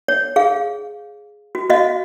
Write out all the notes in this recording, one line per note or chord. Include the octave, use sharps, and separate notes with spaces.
C#5
G#4 F5
F#4
F#4 D#5 F5